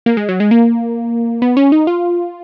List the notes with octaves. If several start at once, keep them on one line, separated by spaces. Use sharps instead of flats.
A#3
G#3
F#3
G#3
A#3
B3
C#4
D#4
F4